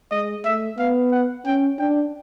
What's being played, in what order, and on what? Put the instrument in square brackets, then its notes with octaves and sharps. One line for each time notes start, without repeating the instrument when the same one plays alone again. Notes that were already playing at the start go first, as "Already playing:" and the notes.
[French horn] G#3 [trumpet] D#5
[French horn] A3 [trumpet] E5
[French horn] B3 [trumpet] F5
[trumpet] F#5
[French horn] C#4 [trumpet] G5
[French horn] D4 [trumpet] G5